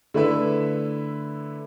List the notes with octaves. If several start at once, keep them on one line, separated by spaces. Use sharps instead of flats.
D3 A3 E4 B4 E5